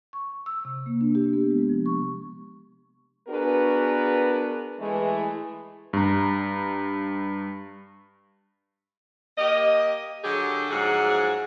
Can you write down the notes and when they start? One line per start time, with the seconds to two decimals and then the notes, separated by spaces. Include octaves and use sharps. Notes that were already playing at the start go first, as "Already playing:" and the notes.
0.13 C#6
0.46 E6
0.65 C3
0.86 A#3
1.01 D4
1.15 G4
1.33 B3
1.51 G#3
1.69 F3
1.86 C#6
3.28 B3 D4 F#4 G#4 A#4 B4
4.80 E3 G#3 A3
5.93 G2 A#5
9.38 A#3 G4 D#5
10.24 D3 F#3 G4 G#4
10.71 G#2 F3 F#3 G#4 F#5